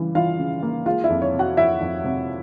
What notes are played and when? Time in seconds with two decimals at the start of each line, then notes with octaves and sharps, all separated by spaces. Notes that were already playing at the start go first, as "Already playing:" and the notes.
Already playing: C#3 E3 G3
0.15 E3 F4 F5
0.39 C#3
0.63 A#3
0.86 G#3 F4 F5
1.04 E4 E5
1.10 F2
1.22 C#5
1.33 C3
1.39 F#4 F#5
1.57 F2 E4 E5
1.81 F2
2.04 C3